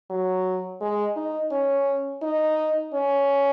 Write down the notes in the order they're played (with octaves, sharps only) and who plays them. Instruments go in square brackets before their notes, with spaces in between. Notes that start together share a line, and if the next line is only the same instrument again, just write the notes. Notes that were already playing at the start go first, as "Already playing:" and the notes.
[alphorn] F#3
G#3
D#4
C#4
D#4
C#4